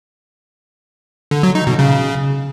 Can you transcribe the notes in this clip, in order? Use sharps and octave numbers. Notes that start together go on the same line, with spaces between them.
D3
F#3
D#4
B2
C#3